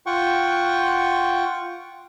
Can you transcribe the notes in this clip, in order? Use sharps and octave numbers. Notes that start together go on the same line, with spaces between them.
F4 F#5 G5 C#6